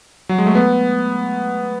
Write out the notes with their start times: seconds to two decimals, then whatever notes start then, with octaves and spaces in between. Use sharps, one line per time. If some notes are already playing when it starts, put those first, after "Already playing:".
0.29 F#3
0.38 G#3
0.46 A3
0.55 B3